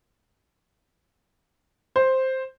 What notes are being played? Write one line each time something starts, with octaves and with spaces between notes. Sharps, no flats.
C5